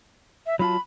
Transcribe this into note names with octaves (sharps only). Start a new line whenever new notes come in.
E5
F#3 F4 A5 B5